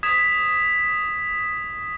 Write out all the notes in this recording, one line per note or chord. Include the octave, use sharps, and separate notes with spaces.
D#6 G#6 B6 E7